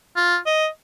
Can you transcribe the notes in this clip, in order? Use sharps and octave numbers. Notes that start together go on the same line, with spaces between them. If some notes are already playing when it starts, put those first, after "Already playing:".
F4
D#5